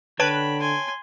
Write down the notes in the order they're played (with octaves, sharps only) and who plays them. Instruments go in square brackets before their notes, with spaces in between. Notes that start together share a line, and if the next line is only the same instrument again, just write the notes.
[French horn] D3 [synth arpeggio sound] B4 [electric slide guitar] C#5 G5 A5 [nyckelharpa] B5
[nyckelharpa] G#5 C6